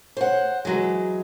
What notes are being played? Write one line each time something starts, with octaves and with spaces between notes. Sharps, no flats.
C5 F#5
E3 F#3 G#3